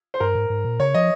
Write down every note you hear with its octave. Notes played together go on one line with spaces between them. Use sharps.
C5
G2 A#4
G#2
G#2
A#2
C#3 C#5
F3 D#5